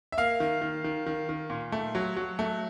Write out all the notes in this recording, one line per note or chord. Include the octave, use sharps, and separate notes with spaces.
E5
A#3 F5
D#3
D#3
D#3
D#3
D#3
A#2
A3
F#3
F#3
A3